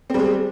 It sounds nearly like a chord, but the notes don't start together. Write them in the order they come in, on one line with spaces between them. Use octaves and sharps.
C4 G3 G#3